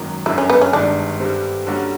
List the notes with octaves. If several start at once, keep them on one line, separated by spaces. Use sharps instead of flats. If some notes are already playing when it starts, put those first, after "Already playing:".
Already playing: G#1 F#2 D#3 F#3 A#3
G1 F#2 D3 F#3 E4
C#4
B3
C#4
G1 G2 D#3 G#3 D4
G2 D3 G3 C4
D3 G3 A#3 C#4 F#4